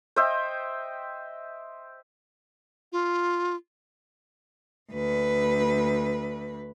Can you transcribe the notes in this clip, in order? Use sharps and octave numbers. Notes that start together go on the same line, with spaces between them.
C5 D#5 E5 G5
F4
D2 B4